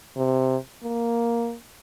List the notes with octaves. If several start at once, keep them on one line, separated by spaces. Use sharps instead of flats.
C3
A#3